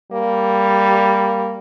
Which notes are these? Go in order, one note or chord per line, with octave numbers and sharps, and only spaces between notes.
G3 A#3